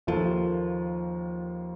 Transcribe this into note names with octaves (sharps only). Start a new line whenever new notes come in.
D#2 D#3 F3 A#3 F4 A4